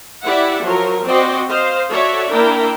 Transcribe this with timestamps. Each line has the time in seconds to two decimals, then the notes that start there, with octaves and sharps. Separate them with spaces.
0.24 E4 G4 D5 E5 F#5
0.63 F3 F#3 A#4
1.07 C4 F#4 C5 D5 D#5 G5
1.48 C5 D#5 F5
1.91 F#4 A4 C#5 D5 E5
2.31 A#3 D4 E4 A#4 G5